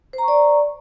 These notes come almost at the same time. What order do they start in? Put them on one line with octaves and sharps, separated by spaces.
C5 A#5 C#6 D5